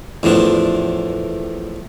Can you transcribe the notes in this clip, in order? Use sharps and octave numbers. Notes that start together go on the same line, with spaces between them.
E2 A2 F3 D4